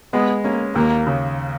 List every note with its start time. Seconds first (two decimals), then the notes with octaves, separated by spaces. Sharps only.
0.13 G#3 B3
0.44 A#3 C#4
0.75 D#2 A#3
1.07 C#3